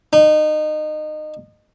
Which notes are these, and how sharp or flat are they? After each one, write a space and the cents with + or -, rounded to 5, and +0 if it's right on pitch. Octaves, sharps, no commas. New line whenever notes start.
D#4 -25